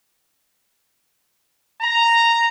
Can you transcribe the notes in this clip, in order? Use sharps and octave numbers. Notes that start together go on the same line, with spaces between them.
A#5